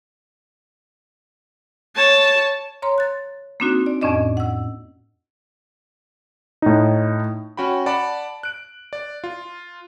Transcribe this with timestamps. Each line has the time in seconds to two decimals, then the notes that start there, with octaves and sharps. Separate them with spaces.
1.96 C#5 A5
2.82 C#5 A#5 C6
2.98 F#6 A6
3.60 A#3 C4 D4 D#4 F#4
3.86 D5
4.01 F2 A2 C#4 D4 D5 D#5
4.37 F#5 E6
6.62 A2 D#4
7.57 C#4 F#4 G5 B5
7.86 D5 F#5 A5 B5 D6
8.43 F#6 D7
8.93 D5
9.24 F4